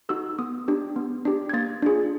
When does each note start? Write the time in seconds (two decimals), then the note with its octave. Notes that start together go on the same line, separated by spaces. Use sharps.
0.09 D#4 F#4 A4 E6
0.39 B3 D#6
0.68 D4 G4
0.96 B3
1.25 D4 G4
1.49 G#6
1.53 A#3 A6
1.82 D4 F4 G#4